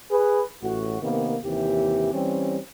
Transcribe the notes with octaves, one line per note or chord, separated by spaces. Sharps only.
G#4 B4
A1 A2 F#4
C3 D#3 A#3 B3
D#2 C3 E3 G4
E3 G3 C4 C#4